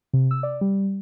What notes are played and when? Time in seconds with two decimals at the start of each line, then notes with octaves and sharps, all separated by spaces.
0.13 C3
0.31 E6
0.43 D5
0.61 G3